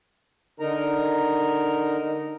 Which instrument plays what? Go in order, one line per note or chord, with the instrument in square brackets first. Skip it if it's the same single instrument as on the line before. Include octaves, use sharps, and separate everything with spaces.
[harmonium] D3 D#4 A#4 A#5